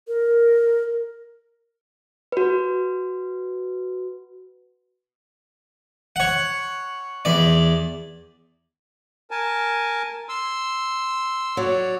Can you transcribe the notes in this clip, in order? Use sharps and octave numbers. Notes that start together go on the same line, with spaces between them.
A#4
F#4 B4
C#5 F#5
E2 D5
A#4 G#5 A5
C6 E6
F#3 C#5 D5